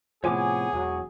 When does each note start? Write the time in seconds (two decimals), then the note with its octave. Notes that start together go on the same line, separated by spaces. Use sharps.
0.24 A2 C3 F3 B3 G#4 C#5 G#5 D6
0.73 E1 F#3